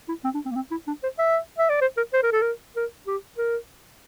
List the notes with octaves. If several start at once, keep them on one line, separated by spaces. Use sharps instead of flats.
E4
C4
D4
C4
A#3
C4
E4
D4
C5
E5
E5
D5
C5
A#4
C5
A#4
A4
A#4
A#4
G4
A#4